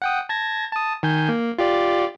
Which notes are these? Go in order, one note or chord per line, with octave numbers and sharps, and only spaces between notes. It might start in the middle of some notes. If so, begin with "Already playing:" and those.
F#5 G5 D#6
A5 G#6 A#6
A5 D#6
D#3 G#5 G6
A#3
F4 G4 D5